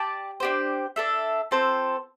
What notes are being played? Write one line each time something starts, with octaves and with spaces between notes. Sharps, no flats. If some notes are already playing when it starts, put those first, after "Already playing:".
Already playing: G4 D5 A5
D4 G4 C5
D4 A4 E5
C4 F4 A4 C5